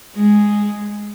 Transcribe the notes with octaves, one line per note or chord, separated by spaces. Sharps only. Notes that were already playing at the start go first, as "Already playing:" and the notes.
G#3